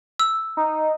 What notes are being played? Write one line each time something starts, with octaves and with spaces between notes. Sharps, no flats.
E6
D#4